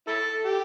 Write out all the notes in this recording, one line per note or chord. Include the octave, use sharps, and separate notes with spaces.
E4 A4
G4